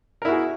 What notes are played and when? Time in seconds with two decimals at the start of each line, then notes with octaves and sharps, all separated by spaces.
0.22 A#4
0.25 E4
0.28 F#4
0.31 G#4